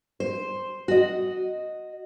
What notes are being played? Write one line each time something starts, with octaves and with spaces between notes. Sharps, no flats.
C5
F#4 D#5